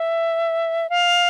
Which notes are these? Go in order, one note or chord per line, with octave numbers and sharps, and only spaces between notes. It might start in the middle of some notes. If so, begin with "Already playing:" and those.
Already playing: E5
F5